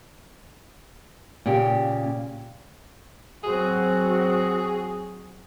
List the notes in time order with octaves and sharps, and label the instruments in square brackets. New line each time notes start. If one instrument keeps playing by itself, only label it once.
[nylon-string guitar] A#2 C#3 G4
[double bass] F#3 C4 [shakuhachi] F#4 [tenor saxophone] G#4